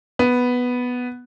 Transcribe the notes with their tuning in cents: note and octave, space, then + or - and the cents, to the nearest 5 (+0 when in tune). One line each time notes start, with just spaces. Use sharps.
B3 +0